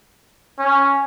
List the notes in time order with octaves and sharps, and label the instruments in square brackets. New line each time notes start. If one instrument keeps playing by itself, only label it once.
[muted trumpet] C#4